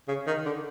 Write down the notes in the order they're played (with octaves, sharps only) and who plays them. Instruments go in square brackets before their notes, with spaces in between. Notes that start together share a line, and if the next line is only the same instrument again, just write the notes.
[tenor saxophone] C#3
D#3
D3